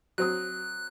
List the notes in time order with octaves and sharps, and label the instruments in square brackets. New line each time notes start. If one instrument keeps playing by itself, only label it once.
[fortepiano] F#3 C4 D#6 [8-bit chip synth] F#6